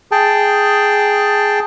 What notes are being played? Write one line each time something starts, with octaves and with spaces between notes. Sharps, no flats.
G#4 G5 A5